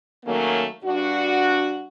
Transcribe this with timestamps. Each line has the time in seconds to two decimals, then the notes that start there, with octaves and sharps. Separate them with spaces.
0.25 D#3 F#3 A3 A#3 C#4
0.84 G2 D4 F#4